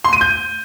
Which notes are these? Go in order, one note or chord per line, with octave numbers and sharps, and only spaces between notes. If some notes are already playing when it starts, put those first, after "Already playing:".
C6
D#7
G6